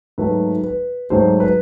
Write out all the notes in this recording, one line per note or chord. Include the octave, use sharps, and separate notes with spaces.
G#2 D#3 F#3 A3 B4
B4
G#2 D#3 F#3 A3 C5
B4